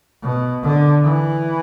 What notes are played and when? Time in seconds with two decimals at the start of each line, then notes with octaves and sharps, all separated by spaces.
0.22 B2
0.63 D3
1.03 E3